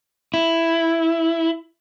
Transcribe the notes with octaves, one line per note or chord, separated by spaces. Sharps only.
E4